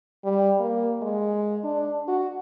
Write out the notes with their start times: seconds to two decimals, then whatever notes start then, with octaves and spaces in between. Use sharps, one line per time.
0.25 G3
0.60 A#3
1.02 G#3
1.64 D4
2.08 F#4